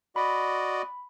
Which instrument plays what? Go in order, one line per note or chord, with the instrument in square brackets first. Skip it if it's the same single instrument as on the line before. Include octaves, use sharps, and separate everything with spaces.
[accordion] F#4 D5 D#5 [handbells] B5